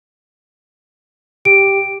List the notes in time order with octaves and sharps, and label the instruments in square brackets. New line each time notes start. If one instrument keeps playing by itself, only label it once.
[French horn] G4 [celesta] D7